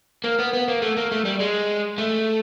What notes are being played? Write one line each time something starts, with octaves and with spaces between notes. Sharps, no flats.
A#3
B3
B3
A#3
A3
A#3
A3
G3
G#3
A3